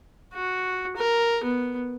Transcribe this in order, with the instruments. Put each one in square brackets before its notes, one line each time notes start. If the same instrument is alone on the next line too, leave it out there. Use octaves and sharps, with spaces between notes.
[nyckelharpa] F#4
A#4
B3